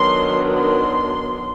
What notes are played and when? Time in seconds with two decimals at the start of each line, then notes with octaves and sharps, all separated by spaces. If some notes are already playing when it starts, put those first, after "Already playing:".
Already playing: D#3 F#3 B3 D4 C6
0.57 C6